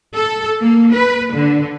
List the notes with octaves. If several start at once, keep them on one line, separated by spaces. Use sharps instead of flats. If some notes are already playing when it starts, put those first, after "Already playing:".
A4
A#3
B4
D3